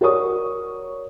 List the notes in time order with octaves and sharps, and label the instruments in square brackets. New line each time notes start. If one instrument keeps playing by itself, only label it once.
[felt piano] F#4 A#4 C#5 D5 C#6 D#6